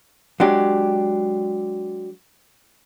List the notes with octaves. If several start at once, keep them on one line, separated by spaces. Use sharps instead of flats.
F#3 G#3 D4 G4